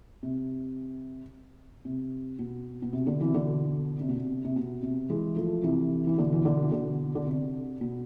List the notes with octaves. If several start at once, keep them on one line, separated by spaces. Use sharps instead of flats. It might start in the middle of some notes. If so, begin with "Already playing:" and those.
C3
C3
B2
B2
C3
B2 D3
C3 E3
B2 D3
C3
B2
C3
C3
B2
C3
E3 G#3
F3 A3
C3 E3
E3
B2 D3
E3
B2 D3
E3
B2 D3
D3
C3
B2